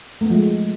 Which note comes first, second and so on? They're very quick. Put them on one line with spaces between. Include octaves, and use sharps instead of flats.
A3 B3 F3 G#3